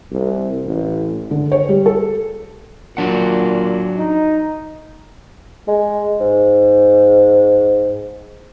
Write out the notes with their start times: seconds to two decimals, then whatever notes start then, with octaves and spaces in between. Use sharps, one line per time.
0.12 C2
0.65 A1
1.31 D3
1.52 C#5
1.69 G3
1.86 A4
2.97 A#2 F#3 D4 F#5
3.97 D#4
5.68 G#3
6.20 G#2